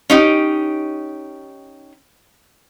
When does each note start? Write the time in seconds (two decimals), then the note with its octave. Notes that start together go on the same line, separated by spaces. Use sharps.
0.10 C#4 D#4 G4